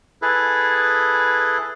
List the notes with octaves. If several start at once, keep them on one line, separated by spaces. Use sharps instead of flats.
E4 G#4 A4 B4